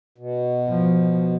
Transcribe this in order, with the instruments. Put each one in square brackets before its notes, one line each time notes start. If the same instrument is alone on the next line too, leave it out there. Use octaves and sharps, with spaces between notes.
[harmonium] B2
[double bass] F3